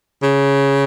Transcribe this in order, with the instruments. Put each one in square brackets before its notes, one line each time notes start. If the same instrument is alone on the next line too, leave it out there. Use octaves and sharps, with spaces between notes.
[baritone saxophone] C#3